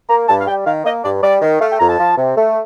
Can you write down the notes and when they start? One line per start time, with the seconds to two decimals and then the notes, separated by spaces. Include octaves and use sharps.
0.09 A#3 A#5
0.29 G2 A5
0.40 F5
0.47 G3 G5
0.66 D#3 F5
0.85 A#3 D#5
1.04 G2 D5
1.23 G3 D5
1.42 D#3
1.61 A3 F5
1.71 G5
1.80 F2 A#5
1.89 A5
1.99 F3
2.18 C3
2.37 A3